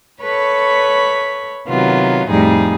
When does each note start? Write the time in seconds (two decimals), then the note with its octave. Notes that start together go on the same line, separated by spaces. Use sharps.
0.22 A4 B4 C#5 B5 C#6
1.67 C3 D#3 F#3 B3 F4
2.28 F2 A2 F3 G3 D#4 G#4